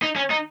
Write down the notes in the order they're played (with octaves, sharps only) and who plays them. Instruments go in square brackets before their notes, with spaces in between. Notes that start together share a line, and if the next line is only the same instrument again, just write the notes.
[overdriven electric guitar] D#4
C#4
D#4